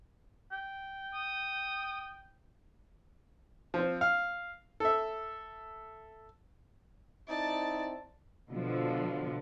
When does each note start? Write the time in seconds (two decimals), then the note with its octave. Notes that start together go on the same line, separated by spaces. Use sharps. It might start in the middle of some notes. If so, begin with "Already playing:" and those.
0.52 G5
1.14 D#6
3.74 F3 C4
4.01 F5
4.80 A4 E5
7.28 C4 D#4 E4 D5 A5
8.52 B2 D3 F3